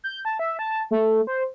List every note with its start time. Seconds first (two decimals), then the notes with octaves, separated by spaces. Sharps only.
0.04 G6
0.25 A5
0.39 E5
0.59 A5
0.91 A3
1.27 C5